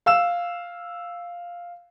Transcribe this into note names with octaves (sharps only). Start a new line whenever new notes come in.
F5 E6 E7